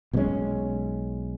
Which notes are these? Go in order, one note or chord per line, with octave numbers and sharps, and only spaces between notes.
B1 B2 G#3 C#4